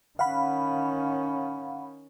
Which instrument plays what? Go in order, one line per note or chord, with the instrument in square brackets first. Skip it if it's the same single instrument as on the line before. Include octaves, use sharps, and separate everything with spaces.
[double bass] D#3 C#4 [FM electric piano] F5 F#5 B5